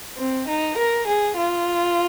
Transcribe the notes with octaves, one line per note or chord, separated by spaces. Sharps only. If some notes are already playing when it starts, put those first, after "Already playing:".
C4
D#4
A#4
G#4
F4